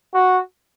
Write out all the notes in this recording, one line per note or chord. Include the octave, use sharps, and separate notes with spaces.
F#4